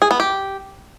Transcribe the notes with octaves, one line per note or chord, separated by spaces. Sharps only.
G#4
B3
G4